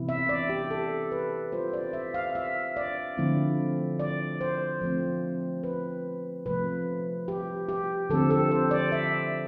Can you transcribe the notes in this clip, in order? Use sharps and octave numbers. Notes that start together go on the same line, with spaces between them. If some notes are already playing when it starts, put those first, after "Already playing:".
Already playing: C3 E3 B3 E4
E5
D5
G4
A4
B4
G3 C4 F4 C5
D5
E5
F5
E5
D5
D3 F3 A3 C4 E4
D5
C5
F3 A3 C4
B4
C3 F3 A3 B4
G4
G4
D3 F3 A3 C4 A4
A4
C5
D5
E5